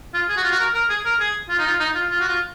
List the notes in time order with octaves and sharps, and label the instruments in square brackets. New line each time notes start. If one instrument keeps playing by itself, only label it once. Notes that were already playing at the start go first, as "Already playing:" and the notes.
[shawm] F4
G#4
F#4
F4
F#4
A#4
A#4
G#4
A#4
G#4
F4
D#4
F4
D#4
F4
F4
F#4
F4